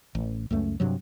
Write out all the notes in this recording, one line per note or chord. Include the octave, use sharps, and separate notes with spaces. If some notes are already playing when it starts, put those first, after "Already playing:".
A1
C#2 F#2 A3
G2 C3 F#3